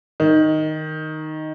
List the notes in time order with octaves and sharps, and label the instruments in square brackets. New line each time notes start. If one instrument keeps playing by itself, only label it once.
[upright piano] D#3